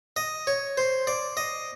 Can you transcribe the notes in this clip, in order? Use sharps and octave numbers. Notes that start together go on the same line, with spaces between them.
D#5
C#5
C5
D5
D#5